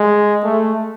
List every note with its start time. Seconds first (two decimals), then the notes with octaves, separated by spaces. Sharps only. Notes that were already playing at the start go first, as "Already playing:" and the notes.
Already playing: G#3
0.43 A3